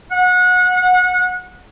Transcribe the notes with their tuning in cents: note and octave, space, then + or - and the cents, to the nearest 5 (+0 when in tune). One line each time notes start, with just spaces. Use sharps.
F#5 -25